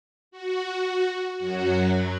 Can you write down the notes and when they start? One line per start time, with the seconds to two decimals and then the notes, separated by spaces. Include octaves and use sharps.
0.31 F#4
1.39 F#2 F#3 F#4